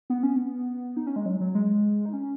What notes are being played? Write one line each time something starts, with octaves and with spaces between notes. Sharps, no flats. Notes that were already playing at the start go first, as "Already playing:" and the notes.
B3
C#4
B3
D#4
C#4
G#3
F#3
F#3
G#3
D#4
C#4